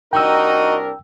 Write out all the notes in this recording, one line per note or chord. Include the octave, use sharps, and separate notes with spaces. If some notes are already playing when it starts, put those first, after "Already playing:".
C2 D4 D#4 F#4 A#4 D#5 G5 E6